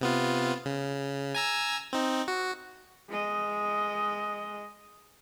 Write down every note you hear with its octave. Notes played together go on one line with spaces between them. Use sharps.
C3 B3 F4
C#3
G#5 A#5 E6
C4 D#4
F#4
G#3 D#5